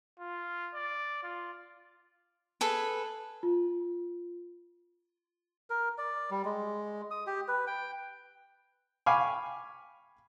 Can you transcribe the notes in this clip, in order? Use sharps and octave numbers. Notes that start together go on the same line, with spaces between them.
F4
D5
F4
G#4 A4 B4
F4
A#4
D5
G3
G#3
D#6
G4
B4
G5
F5 G5 G#5 B5 C#6 D6